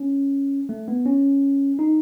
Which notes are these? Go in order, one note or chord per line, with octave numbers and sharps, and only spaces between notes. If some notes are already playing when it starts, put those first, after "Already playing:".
Already playing: C#4
A3
B3
C#4
D#4